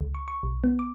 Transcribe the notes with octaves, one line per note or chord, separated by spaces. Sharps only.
C#2
C#6
C#6
B1
B3
D6